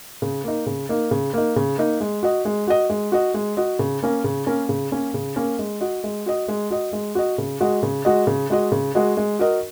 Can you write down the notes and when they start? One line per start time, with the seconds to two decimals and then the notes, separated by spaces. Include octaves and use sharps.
0.22 C#3
0.44 A#3 D#4
0.66 C#3
0.89 A#3 D#4
1.11 C#3
1.34 A#3 D#4
1.56 C#3
1.78 A#3 D#4
2.01 G#3
2.23 F#4 D#5
2.45 G#3
2.67 F#4 D#5
2.90 G#3
3.12 F#4 D#5
3.34 G#3
3.57 F#4 D#5
3.79 C#3
4.03 A#3 C#4 A#4
4.24 C#3
4.46 A#3 C#4 A#4
4.69 C#3
4.92 A#3 C#4 A#4
5.14 C#3
5.36 A#3 C#4 A#4
5.59 G#3
5.81 F#4 D#5
6.04 G#3
6.26 F#4 D#5
6.48 G#3
6.71 F#4 D#5
6.93 G#3
7.15 F#4 D#5
7.38 C#3
7.60 G#3 F#4 D#5
7.83 C#3
8.05 G#3 F#4 D#5
8.27 C#3
8.50 G#3 F#4 D#5
8.72 C#3
8.95 G#3 F#4 D#5
9.17 G#3
9.39 F#4 A#4 D#5